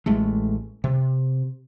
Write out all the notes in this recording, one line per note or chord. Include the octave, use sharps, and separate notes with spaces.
A1 G#3 A3
C3